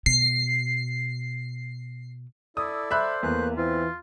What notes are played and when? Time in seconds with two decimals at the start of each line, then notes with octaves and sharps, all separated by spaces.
0.06 B2 C7
2.57 E4 A4 D5 D#6
2.91 C5 E5 B5 F#6
3.23 E2 A3 A#3 B4 F#6
3.57 E3 C4 F4